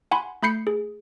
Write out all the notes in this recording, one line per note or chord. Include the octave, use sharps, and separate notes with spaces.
F#5 G#5 B5 C6
A3 B5 G6 C7 C#7
G#4